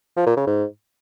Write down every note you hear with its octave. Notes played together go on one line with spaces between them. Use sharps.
F3
A#2
C#3
G#2